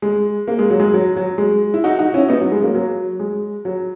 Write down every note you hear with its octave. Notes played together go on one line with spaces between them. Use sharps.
G#3
A#3
G#3
F#3
G#3
F#3
F#3
G#3
E4
D#4 F#4
D#4 F#4
C#4 E4
B3 D#4
F#3
G#3
F#3 A#3
F#3
G#3
F#3